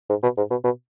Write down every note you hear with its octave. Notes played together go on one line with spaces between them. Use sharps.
G#2
B2
G#2
B2
B2